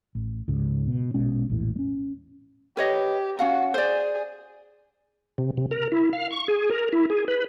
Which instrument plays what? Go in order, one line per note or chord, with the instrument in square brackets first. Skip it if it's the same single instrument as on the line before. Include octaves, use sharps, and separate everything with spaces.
[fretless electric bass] A1
C#2 G#2 C#3
B2
A#1 B2 G#3 C#4
A#1 E2 A2 E3
G#3 C#4
[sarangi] G4 [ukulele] B4 C#5 D#5
[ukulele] C#4 F5 F#5 [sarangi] F#4
[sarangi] G#4 [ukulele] C5 D5
[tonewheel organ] C3
C3
A#4
E4
F5
C#6
G#4
A#4
E4
G#4
B4